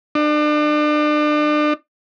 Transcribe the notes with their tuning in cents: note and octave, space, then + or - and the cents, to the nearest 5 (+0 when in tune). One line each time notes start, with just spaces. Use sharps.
D4 +35